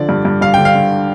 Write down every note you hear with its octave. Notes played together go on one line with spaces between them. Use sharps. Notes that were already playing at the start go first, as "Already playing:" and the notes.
Already playing: D3 F3 D5
G2
G2
G2 F5
D3 G5
F5
D3